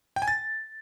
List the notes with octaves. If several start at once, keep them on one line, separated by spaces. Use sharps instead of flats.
G5
G#5
A6